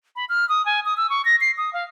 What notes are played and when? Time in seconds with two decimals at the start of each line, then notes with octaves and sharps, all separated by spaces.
0.16 B5
0.29 F6
0.49 D#6
0.66 G#5
0.85 D#6
0.97 E6
1.10 C#6
1.25 A#6
1.41 C7
1.58 D#6
1.73 F5